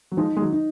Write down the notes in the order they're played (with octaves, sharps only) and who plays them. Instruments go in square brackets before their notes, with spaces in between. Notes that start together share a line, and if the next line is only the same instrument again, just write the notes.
[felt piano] F#3
[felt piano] F3 G#3 [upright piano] D#4
[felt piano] G#3
D#3 F#3
[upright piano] D#4